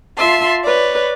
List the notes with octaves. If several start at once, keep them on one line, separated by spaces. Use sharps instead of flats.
F4 E5 A5 C6
B4 C#5 D5